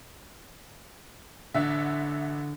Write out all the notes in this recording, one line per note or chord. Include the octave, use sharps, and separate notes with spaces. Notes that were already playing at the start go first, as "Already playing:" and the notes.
A1 D3 F#4 E5